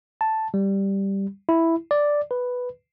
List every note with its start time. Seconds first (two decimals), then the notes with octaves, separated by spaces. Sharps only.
0.21 A5
0.54 G3
1.49 E4
1.91 D5
2.31 B4